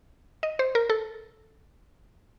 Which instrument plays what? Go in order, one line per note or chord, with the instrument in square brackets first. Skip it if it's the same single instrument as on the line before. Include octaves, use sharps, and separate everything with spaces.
[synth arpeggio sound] D#5
C5
A#4
A4